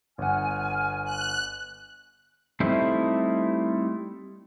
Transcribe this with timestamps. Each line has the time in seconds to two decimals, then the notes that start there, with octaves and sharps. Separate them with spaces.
0.18 G1 F#5 G#5 F6
1.05 F#6
2.60 G3 A3 C4 D#4 E4